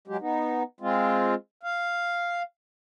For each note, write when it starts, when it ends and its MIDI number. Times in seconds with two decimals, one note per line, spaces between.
0.07 0.17 54
0.07 0.17 56
0.07 0.17 67
0.21 0.63 59
0.21 0.63 63
0.80 1.35 56
0.80 1.35 60
0.80 1.35 65
1.63 2.42 77